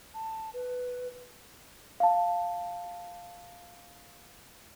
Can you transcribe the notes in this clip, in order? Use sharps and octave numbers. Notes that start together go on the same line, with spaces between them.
A5
B4
F5 A5